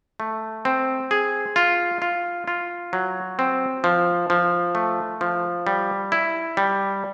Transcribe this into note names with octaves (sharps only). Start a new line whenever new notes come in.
A3
C4
G#4
F4
F4
F4
F#3
C4
F3
F3
A3
F3
G3
E4
G3